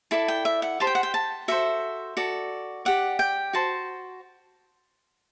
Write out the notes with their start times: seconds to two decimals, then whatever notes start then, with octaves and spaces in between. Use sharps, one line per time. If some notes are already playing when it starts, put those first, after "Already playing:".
0.11 E4 A4 D5 A5
0.28 G5
0.45 E5
0.62 F#5
0.80 G4 C5 A5
0.87 G5
0.95 F#5
1.03 G5
1.14 A5
1.48 F#4 A4 C5 E5
2.17 F#4 A4 D5
2.85 G4 D5 F#5
3.19 G5
3.53 F#4 C5 A5